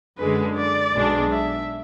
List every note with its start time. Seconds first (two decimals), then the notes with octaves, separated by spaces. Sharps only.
0.18 F#2 D3 G#3 B4
0.56 D5
0.94 B1 B2 G#3 D4
1.32 E5